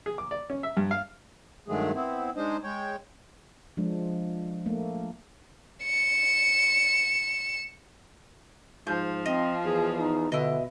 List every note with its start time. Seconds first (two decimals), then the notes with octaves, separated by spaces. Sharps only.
0.06 G#4
0.18 D6
0.31 D5
0.50 C#4
0.63 E5
0.77 G2
0.91 F5
1.68 G2 D#3 F#3 G#3 A3 G#4
1.94 B3 C4 E4
2.36 G#3 D4 D#4 C5 D#5
2.64 G#3 C#5 G5
3.77 F3 G#3 D4
4.66 A3 A#3
5.84 C#7 E7
8.87 G#2 F3 G6
9.26 C4 D#5
9.65 E2 G#4
9.99 D#4
10.32 B2 D3 E4 D#5